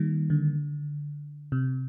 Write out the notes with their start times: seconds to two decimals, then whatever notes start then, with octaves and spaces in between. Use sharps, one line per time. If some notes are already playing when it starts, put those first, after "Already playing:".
Already playing: D#3 G3 A#3
0.30 D3
1.52 C3